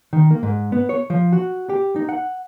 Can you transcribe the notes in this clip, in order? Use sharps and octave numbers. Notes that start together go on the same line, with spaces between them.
D#3
A#3
G#2
B3
C#5
F3
F#4
G4
D#4
F#5